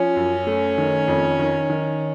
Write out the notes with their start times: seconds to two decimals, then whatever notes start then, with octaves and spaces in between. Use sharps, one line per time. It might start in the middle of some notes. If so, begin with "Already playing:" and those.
Already playing: F3 C#4
0.16 F#2
0.47 A3
0.78 D#3
1.08 F2
1.39 D#3
1.69 D#3